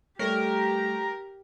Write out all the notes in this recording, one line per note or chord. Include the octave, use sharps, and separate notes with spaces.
G3 A3 G4 A#4 C#5